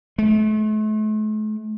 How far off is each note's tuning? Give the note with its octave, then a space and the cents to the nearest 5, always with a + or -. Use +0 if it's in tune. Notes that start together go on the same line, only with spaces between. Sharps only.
A3 -40